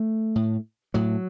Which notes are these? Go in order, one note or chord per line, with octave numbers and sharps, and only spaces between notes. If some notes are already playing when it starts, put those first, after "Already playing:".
Already playing: A3
A2
A2 F#3